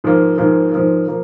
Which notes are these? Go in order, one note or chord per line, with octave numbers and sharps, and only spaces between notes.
G#2 F3 A#3
G#2 F3 A#3
G#2 F3 A#3
F3 A#3